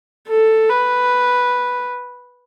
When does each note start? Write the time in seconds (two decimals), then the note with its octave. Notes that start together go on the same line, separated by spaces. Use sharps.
0.28 A4
0.70 B4